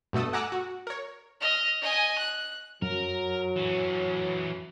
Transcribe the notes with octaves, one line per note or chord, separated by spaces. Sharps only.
G2 B2 A3 A4 D#6
F#5 G#5 A#5 D6 E6 F#6
F#4
A#4 C#5
D#5 F6
D#5 G#5
F#6
F#2 F#3 A#4
E3 C#4